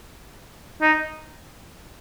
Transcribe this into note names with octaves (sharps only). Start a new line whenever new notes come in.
D#4